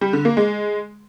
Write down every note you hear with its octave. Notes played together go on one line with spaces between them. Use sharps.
G3
D3
A#3
G#3